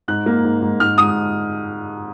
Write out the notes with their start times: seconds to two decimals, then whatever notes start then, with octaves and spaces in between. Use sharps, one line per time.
0.08 G#2 F#6
0.26 A#3
0.44 G#2
0.62 G#2
0.80 G#2 F6
0.98 G#2 D#6